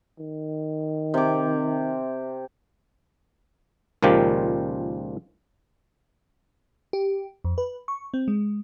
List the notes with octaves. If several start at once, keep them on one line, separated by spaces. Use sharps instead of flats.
D#3
C3 D6
C#2 A#2 D#3 F3 G4
G4
F2
B4
C#6
C4
G#3